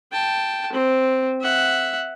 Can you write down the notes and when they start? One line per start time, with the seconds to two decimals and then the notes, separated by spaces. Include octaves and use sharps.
0.12 G5 A5
0.72 C4
1.41 E5 F#5